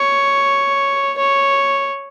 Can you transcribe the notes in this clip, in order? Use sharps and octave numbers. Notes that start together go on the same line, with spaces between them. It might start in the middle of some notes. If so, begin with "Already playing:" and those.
Already playing: C#5
C#5